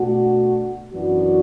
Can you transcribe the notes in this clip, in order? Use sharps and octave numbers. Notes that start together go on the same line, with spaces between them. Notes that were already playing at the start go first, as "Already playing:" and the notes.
Already playing: B2 A3 D4 F#4
F#2 E3 B3 D4 F#4